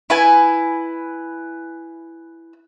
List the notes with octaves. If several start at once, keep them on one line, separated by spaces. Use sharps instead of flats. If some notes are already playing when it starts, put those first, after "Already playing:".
E4 B4 G#5